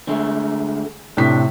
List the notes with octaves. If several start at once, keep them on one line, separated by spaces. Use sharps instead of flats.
D3 G#3 A3
A2 C3 D4 B6